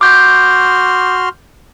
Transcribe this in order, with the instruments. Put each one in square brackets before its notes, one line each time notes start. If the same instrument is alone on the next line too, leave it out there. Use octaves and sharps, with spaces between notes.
[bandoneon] F#4 C6 F6 [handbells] D6 G6